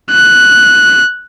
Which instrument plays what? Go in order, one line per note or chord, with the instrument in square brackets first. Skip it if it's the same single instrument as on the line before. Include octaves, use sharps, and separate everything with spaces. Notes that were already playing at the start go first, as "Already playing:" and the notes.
[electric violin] F#6